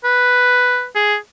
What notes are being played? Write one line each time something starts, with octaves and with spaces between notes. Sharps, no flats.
B4
G#4